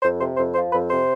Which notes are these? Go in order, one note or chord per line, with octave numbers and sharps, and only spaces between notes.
F2 C5
C3 C5
F2 C5
F3 C5
F2 B4
C3 C5